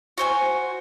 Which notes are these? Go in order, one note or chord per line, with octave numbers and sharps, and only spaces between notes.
F#4 C5 G#5